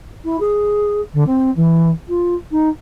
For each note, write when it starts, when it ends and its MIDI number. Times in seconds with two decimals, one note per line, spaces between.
0.25 0.37 64
0.40 1.01 68
1.13 1.23 50
1.27 1.50 60
1.56 1.90 52
2.08 2.35 65
2.51 2.69 63